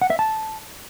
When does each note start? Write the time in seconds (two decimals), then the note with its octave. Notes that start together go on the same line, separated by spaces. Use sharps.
0.01 F#5
0.10 E5
0.19 A5